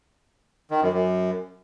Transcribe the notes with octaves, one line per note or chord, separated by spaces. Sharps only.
D#3
F#2
F#2